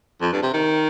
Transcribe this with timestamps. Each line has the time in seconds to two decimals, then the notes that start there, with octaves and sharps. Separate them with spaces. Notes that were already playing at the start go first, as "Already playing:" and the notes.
0.21 F2
0.32 G2
0.42 C3
0.53 D#3